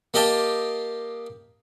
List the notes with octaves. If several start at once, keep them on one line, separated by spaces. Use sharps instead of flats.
A#3 G4 D#5 F5 G5 A5